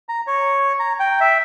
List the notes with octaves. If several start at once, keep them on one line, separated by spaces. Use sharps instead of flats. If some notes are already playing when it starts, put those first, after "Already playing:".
A#5
C#5
A#5
G5
E5